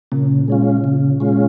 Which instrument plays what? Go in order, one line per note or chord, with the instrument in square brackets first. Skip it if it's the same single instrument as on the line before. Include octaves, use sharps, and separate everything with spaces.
[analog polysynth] A#2 [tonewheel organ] C#3
[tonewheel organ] G#3 C#4 F4
C#3
G#3 C#4 F4